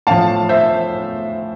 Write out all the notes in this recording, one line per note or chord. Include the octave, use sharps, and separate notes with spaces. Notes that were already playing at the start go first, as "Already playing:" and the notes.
A2 F3 F5 A5
C5 E5